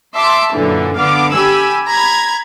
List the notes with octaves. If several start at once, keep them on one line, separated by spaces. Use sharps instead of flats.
E5 A5 C6 D6
F#2 A#2 D3 E3
D3 B3 F5 D6
G4 G#5 B5 E6
A#5 B5 G#6